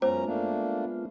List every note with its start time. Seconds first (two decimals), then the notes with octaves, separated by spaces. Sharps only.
0.02 F#2 G#3 B3 C#4 F4 C5 A#5
0.25 A3 A#3 D4